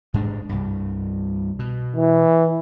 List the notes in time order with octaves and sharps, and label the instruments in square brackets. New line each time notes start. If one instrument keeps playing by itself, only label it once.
[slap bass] G#2 G#3 D4
C2 G2
B2
[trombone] E3